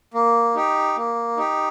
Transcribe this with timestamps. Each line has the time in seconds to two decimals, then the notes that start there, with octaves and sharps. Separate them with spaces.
0.14 A#3
0.55 D#4 G4
0.97 A#3
1.37 D#4 G4